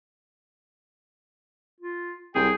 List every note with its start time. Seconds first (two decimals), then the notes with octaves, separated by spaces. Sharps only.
1.80 F4
2.35 C2 G#4 G5